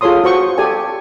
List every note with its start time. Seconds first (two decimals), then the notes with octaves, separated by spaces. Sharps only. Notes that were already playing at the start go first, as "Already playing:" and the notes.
0.01 F4 G#4 A4 C#5 C6 D#6
0.24 F#4 C5 C#6
0.58 G4 A4 D5 G#5